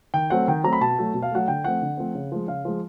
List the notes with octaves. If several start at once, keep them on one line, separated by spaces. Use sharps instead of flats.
D#3 G5
F#3 A3 C4 F#5
D#3 G5
F#3 A3 C4 A#5
B5
B2 A5
F#3 A3
B2
F5
F#3 A3 F#5
D3 G5
F3 A3 C4 F#5
D3
F3 A3 C4
C#3
F3 G#3
C#3 F5
F3 G#3